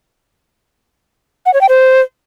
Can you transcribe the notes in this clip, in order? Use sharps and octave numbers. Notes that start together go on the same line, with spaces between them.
F#5
C#5
G5
C5